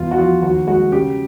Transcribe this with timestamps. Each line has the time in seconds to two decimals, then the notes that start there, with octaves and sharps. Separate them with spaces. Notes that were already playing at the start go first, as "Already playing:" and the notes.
Already playing: E2 F4
0.11 F#4
0.18 F3 F4
0.42 D#2 F#4
0.67 G#3 F#4
0.92 C#3 G4